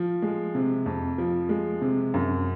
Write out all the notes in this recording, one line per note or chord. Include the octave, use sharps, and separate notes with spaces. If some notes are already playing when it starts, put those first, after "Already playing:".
Already playing: F3
G#3
C3
F2
F3
G#3
C3
F#2